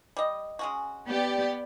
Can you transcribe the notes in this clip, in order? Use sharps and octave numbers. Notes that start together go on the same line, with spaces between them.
G3 D#5
G#3 C#4 F#4
B3 G4 D5